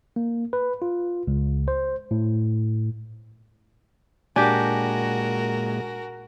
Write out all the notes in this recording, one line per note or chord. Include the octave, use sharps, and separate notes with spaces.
A#3
B4
F4
C#2
C5
A2
A#2 G#3 D4 F#4 G4 A#4 G#5